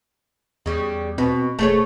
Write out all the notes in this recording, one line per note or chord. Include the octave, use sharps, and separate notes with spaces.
E2 C#3 G3
B2 C4
E1 A3 G#4 C#5